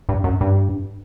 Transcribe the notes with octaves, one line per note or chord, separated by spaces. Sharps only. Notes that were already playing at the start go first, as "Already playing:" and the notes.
G2
F#2
G2